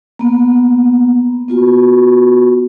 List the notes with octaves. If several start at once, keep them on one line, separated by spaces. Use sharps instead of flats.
A#3 B3
B3 F4 F#4